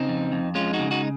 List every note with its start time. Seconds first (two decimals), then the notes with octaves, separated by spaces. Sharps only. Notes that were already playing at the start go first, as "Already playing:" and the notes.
Already playing: C#3 C4 D#4
0.08 F2
0.32 F2
0.55 G#3 C#4 F4
0.73 D#4 F#4
0.79 C#3
0.91 D#4 F#4